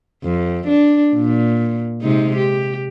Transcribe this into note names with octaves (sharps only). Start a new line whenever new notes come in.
F2
D4
A#2
C3 G#3 D#4
G4